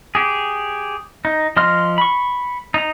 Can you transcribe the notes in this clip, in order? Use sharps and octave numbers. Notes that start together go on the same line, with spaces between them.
G4 G#4
D#4
F3 D#5 C6 F6
B5 C#6
D#4 A#5